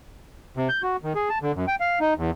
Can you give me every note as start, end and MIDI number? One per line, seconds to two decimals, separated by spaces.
0.57 0.68 48
0.69 0.82 91
0.83 0.97 66
1.03 1.13 51
1.15 1.29 68
1.29 1.38 81
1.42 1.52 50
1.55 1.65 42
1.68 1.75 79
1.80 1.99 77
2.00 2.14 63
2.18 2.31 40